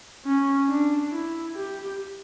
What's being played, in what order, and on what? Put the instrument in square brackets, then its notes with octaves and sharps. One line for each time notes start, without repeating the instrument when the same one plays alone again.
[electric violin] C#4
D4
E4
G4